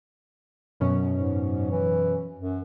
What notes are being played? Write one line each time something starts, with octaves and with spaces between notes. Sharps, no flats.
F#2 B2 C#4
G#2
E3
F#2